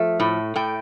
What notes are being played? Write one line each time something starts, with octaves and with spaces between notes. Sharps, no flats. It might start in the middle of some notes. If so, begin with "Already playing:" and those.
Already playing: F3 A3
A2
A2 G5